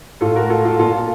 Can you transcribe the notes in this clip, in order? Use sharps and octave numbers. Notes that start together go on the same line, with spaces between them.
A2 F4 A4
F#4 A#4
F4 A4
F4 A4
A#2 F4 A4